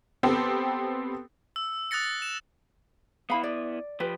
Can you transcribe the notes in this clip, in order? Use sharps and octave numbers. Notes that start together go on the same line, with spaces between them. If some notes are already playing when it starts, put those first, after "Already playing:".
B3 C4 G4 A4
E6
D#6 F#6 A6 A#6 C#7
E7
B3 E4 F5 B5
D5
F3 G4 B4